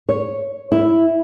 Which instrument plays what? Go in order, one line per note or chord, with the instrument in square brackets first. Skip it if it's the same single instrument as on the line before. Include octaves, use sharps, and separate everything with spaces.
[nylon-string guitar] C#5
E4